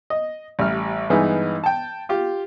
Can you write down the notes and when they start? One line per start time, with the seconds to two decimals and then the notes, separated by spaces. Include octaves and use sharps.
0.10 D#5
0.59 A1 G3 F6
1.10 G2 E3 G#3 B3 D#4
1.64 G5 A5
2.09 F4 G4